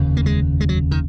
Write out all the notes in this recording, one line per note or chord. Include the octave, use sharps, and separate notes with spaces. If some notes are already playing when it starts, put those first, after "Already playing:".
Already playing: F1 D#2 C#3
A#3
G#3
G#3
F#3
D#3